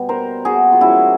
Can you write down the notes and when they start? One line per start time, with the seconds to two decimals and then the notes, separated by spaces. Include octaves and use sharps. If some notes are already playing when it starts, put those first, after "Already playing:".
Already playing: B2 G3 B3
0.09 A#4 C5
0.45 F#4 G#4
0.72 F4
0.81 C#3 F3 G#3 C#4 E4 F#4